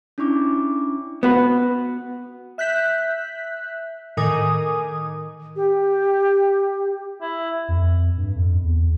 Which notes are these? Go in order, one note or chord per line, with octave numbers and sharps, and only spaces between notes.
C#4 D4 E4 C#6 D6
B3 F#4 B4
E5 F#6 G6 B6
A2 D#3 A#4 G#5 D6 D#6
G4
E4
F2
G2
F2
E2